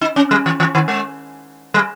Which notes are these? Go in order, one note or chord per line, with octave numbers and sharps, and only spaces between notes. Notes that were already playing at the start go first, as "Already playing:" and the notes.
D#4
C#4
G3
E3
E3
D#3
G#3
G3